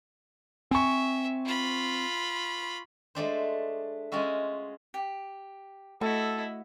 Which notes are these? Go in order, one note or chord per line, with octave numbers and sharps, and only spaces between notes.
C4 E5 G#5 C#6
F4 B5
G#3 A3 D4 C5
G#3 C#4 F4 F#4 E5
G4
A3 E4 F#4 A4 D#5